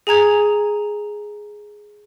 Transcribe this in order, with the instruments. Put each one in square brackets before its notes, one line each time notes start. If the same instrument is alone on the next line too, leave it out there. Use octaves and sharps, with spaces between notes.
[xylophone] G#4 G#5 A#5 G#6